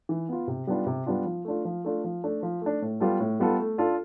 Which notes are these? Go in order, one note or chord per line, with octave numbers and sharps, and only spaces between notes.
E3
B3 F4
C3
G3 B3 D4 F4
C3
G3 B3 D4 F4
F3
A3 D4 F4
F3
A3 D4 F4
F3
A3 D4
F3
A3 D4
A2
G3 B3 F4 A4
A2
G3 B3 F4 A4
A3
D4 F4 A4